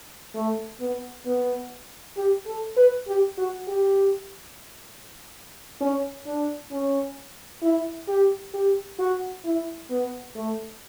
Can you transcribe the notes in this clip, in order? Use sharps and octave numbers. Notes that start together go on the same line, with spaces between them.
A3
B3
B3
G4
A4
B4
G4
F#4
G4
C#4
D4
C#4
E4
G4
G4
F#4
E4
B3
A3